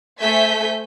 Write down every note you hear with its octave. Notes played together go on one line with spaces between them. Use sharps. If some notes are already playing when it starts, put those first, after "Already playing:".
A3 C5 E5 G#5 G6 B6